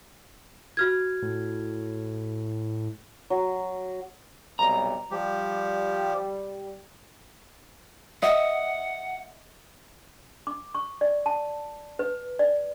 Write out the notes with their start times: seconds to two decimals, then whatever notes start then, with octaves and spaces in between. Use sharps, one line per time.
0.77 F#4 F6 G#6
1.22 A2
3.30 F#3
4.59 B1 C3 G3 A#5
5.11 F3 G3 G4
8.22 D#5 E5 F#5
10.47 D6
10.75 C#6
11.01 D5
11.26 A5
11.99 B4
12.39 D5